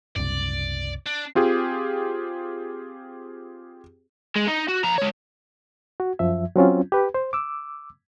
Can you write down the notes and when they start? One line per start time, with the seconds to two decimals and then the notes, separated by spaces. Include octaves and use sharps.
0.16 F#1 C2 D5
1.06 D4
1.35 C4 F4 G4 G#4
4.36 G#3
4.48 D#4
4.69 F#4
4.84 F3 A#5
4.98 G#3 C#5
6.00 F#4
6.19 F#2 F3 E5
6.56 F#3 C4 C#4 F4
6.92 G4 B4
7.14 C5
7.33 D6 E6